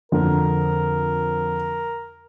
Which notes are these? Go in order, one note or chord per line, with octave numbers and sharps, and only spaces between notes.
F2 D3 A#4